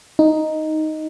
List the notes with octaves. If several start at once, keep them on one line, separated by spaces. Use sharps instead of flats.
D#4